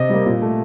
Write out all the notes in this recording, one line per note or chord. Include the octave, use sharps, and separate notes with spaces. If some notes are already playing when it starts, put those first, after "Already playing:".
Already playing: C3 D#5
G3 A#3
A#2
A3